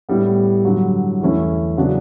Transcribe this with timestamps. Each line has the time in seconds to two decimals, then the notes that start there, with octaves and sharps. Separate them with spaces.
0.09 A2 G3 B3
0.65 G2 D3 F#3
1.22 E2 D3 A3 C#4 E4
1.77 C#3 F#3 B3 D4 F#4